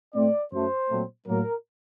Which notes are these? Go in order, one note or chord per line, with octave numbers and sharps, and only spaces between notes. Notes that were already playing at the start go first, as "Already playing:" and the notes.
A2 A3 C4 D5
F#2 F#3 A3 C5
A#2 F#3 A3 C4
A2 F#3 A#3 A#4